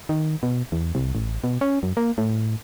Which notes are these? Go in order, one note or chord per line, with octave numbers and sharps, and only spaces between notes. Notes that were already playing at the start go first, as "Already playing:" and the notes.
D#3
B2
E2
C2
A1
B2
C#4
F#2
A#3
A2